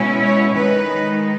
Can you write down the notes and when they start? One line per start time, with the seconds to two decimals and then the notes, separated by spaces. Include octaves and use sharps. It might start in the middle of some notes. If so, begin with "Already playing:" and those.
Already playing: B2 G#3 C#4 E4
0.21 C#5
0.56 D#3 G#3 D#4 B4